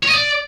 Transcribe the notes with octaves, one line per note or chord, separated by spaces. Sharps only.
C#5
D#5
D5